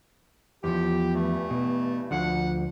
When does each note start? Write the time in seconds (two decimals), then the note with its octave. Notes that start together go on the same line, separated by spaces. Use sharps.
0.64 E2 F3 G4
1.14 G2 E3 A3
1.50 B2
2.11 D2 D3 F3 F#5